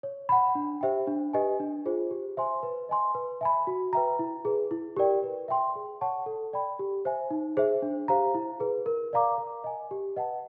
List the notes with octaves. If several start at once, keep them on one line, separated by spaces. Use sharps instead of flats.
C#5
F#5 B5
D4
G4 C5 E5 G5
D4
G4 B4 D#5 G#5
D4
F4 G#4 C5
G4
C5 E5 G#5 C6
B4
D#5 G#5 C6
B4
E5 G#5 B5
F#4
B4 E5 G5 A#5
E4
G#4 B4
E4
G4 A#4 D5 G5
B4
E5 G5 C6
G#4
C#5 F#5 A5 C#6
A4
D5 G5 B5
G4
C5 E5 G#5
D#4
G#4 C5 E5
D4
G4 C5 F5 A#5
E4
G#4 B4
A#4
D5 F5 A#5 D6
A#4
D#5 G#5
G4
B4 D#5 F#5 A5